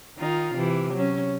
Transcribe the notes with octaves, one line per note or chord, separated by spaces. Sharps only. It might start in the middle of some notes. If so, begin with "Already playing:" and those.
D#3 D#4 F4
C3 E3
F#3 C#4